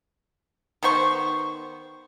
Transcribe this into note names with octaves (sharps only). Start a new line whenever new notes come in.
D#3 B3 C5 C#6